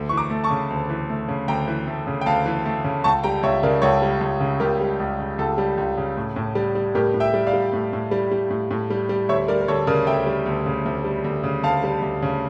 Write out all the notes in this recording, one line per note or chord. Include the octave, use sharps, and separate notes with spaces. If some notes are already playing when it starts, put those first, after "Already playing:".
Already playing: D2
E3 C#6
A#5 D6
A3
A5 C#6
C#3
D2
E3
A3
C#3
D2 G5 A#5
E3
A3
C#3
G5
D2 F5 A5
E3
A3
C#3
C#2 A5 C#6
G3 G5 A#5
C#2 C#5 E5
C#3 A#4 D5
C#2 A4 C#5
G3
C#2
C#3
C#2 G4 A#4
G3
C#2
C#3
C#2 A4
G3
C#2
C#3
A2
A2
G3
G3
A2 G4 A#4
A2
E5 G5
G3
D5 F5
G3
A2
A2
G3
G3
A2
A2
G3
G3
D2 C#5 E5
G3 A#4 D5
A#4
D2 A4 C#5
C#3 A#4 D5
D2 E5 G5
G3
D2
C#3
D2
G3
D2
C#3
D2 F5 A5
G3
D2
C#3